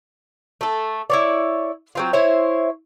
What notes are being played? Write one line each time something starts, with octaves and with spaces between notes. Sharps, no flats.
A3 A4
E4 C#5 D5
F#3 C4 F4
E4 C5 C#5 E5